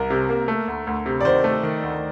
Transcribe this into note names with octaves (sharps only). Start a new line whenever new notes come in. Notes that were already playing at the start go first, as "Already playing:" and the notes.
Already playing: C2 A#4
C3
A#3
A3
D2
D2
C3
D5
D#3 C5
A3
D#3
D2